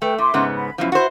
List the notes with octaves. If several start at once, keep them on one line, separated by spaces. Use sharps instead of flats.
A3 B4 G5
A2 E5 C6 D6
G#2 C#3 B3
B5
F#2 B2 F3 E4
E4 F#4 B4 C5